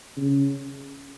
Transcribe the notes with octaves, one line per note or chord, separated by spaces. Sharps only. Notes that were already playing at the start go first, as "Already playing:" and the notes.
C#3